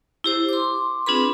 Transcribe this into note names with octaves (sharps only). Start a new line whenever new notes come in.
E4 G4 C5
C6 D6
C4 D4 F4 G#4 B4 B5